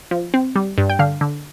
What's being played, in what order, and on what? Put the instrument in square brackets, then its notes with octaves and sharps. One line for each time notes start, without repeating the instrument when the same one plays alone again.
[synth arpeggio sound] F3
C4
G3
G2
G5
D3 F5
D3